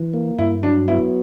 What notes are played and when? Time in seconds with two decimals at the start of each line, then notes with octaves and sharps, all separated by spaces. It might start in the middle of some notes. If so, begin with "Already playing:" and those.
Already playing: E3
0.14 A#3
0.39 G2 E4
0.63 F#3 D4
0.88 B3 E4